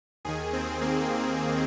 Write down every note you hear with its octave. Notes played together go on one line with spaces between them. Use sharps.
D#2 D#3 G#4
C4
A#3